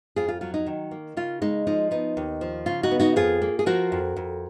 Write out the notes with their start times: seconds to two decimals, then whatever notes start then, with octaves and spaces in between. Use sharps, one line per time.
0.16 F2 F4 G#4
0.28 F4
0.41 F#3 F4
0.54 D#4
0.66 D#3
0.91 A#3
1.17 C#3 F4
1.42 G#3 D#4
1.67 F3 D#4
1.91 B3 D#4
2.17 D#2
2.41 F3
2.66 C#3 F4
2.83 D#4 F#4
2.91 B3
3.00 D#4 F#4
3.16 F2 F4 G#4
3.42 A#3
3.59 G#4
3.66 F3 F#4 A#4
3.92 F2
4.16 F2